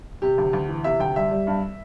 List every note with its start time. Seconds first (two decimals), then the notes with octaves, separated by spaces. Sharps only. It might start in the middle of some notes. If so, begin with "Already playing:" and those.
0.22 C3 G4
0.38 D2
0.53 D2
0.69 E3
0.84 C3 E5
1.00 D2 G5
1.16 G3 E5
1.31 G3
1.47 G2